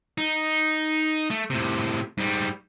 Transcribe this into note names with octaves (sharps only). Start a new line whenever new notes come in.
D#4
A3
A2 C3
G#2 G3